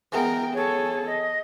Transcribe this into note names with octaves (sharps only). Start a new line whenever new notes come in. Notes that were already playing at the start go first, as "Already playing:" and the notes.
E3 G#3 B3 A#4 G5
G#4 A4 C#5
D#5